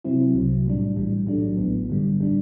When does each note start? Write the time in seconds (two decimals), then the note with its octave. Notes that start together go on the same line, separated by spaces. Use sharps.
0.04 C3 F#3 C4 E4
0.34 C2 C3 F#3
0.66 A2 G3 D4
0.96 B1 A2 E3 G3
1.27 A2 F#3 A3 D4
1.57 A1 A2 E3 B3
1.89 G2 D3 G3
2.21 A2 G3 D4